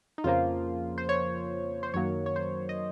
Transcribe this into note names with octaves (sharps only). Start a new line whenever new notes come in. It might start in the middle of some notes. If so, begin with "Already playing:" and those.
D#4
F2 C#3 F3 A#3 F4
C5
C#5
C5
F#2 D#3 F#3 A#3 C#5
C#5
C5
D#5